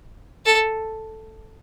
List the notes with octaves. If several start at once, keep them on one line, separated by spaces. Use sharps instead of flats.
A4